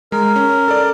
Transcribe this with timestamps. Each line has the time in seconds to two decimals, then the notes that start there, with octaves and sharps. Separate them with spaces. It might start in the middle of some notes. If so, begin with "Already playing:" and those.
0.12 G#3 A#4
0.36 C#4
0.68 A4 D5